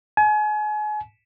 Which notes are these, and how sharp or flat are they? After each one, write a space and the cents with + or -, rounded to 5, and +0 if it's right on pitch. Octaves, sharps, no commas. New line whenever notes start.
G#5 +35